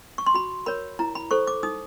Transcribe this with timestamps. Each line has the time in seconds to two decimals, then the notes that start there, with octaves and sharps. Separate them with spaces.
0.18 C#6
0.26 C6
0.34 F#4 B5
0.66 A#4 C#5 B5
0.99 E4 A#5
1.15 B5
1.31 A4 C5 C#6
1.47 D6
1.63 D#4 D#6